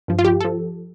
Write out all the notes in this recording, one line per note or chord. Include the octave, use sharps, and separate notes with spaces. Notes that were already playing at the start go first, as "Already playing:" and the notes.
G2 F3
F4
G4
A4
F3